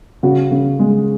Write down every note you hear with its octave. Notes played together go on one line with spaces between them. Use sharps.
C#3 F#4
C#3
G#3